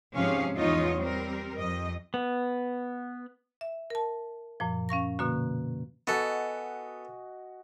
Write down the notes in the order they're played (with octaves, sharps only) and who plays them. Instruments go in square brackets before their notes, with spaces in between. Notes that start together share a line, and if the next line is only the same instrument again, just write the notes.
[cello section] G#2 C3 F3 C#4 G#4 F5
E2 E3 D#4 F4 C#5 D#5
G3 C4 A#4
F2 D#5
[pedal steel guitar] B3
[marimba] E5
A#4 A5
F#2 A#2 F3
C#4 F5 C#6 A#6
B2 D3 A#3 F#4
[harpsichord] B3 A4 [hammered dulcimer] F#4 D#5 G#5